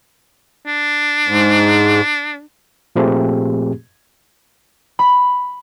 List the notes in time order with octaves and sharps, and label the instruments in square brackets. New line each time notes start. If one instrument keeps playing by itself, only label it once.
[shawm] D4
[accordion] G#2
[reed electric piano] A#2 F3 A3 C4 G4 G#4
[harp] B5